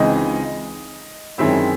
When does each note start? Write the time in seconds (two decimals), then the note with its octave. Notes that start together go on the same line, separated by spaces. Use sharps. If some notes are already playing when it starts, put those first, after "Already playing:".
Already playing: C#2 C#3 E3 C4 D#4 D#5
1.38 F#2 D#3 G#3 C4 E4 E5